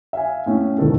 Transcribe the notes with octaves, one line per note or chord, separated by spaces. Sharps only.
E5 F5 G#5
A2 C#4
E1 C#2 G#2 D#3 A4